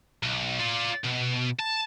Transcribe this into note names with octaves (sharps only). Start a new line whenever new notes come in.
B1
F4 D5
B2
A5